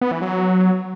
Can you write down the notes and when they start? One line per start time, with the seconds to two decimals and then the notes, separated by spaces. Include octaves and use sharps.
0.01 B3
0.11 E3
0.21 F#3